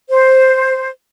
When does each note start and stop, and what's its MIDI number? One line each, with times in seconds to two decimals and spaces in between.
0.10 0.88 72